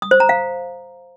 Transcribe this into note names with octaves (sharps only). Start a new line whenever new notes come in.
D#6
C5
A#5
F5